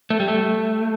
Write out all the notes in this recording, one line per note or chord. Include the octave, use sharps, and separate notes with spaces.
A3
G3
A3